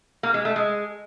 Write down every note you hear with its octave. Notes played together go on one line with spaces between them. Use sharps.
A#3
G#3
A3
G#3